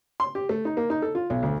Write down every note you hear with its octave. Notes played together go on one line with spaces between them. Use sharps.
C6
G4
A3
D#4
A#3
D#4
A4
F4
B1
D2